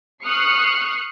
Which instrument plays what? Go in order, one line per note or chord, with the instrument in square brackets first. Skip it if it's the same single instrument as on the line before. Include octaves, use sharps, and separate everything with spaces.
[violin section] C#6 D#6 F6 F#6 C7 C#7